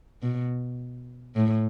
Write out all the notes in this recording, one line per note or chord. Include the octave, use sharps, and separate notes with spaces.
B2
A2